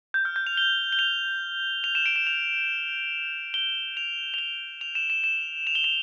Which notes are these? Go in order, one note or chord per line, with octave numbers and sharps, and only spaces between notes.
G6
F6
G6
F7
G7
G7
F7
F7
E7
D7
E7
F7
G7
F7
F7
G7
F7
E7
E7
E7
F7
G7
F7